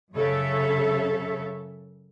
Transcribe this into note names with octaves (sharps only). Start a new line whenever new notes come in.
F#2 C#3 A4 C#5 E5